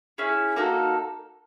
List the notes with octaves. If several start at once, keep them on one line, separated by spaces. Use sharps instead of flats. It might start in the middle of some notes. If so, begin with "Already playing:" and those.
C#4 E4 G#4
A#3 D#4 F#4 A4